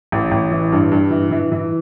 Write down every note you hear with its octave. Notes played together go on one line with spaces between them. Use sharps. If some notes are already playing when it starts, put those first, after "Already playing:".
A1
A1
E3
G2
G2
E3
E3
E3